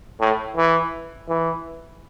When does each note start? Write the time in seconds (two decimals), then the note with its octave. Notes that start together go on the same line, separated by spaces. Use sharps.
0.20 A2
0.57 E3
1.29 E3